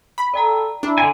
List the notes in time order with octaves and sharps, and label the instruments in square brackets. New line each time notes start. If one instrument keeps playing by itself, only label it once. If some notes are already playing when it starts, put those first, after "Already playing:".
[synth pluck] B5
[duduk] A4 [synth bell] D5 G5 A#5
[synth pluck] D4 [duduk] E4
[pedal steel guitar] D3 G#5